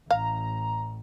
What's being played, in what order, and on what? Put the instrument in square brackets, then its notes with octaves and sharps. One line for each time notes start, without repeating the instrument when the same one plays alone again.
[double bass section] A1 [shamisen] F5 [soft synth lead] A#5